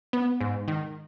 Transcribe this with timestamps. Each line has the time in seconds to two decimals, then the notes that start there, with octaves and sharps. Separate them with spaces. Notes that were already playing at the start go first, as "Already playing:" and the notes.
0.13 B3
0.41 G#2
0.68 D#3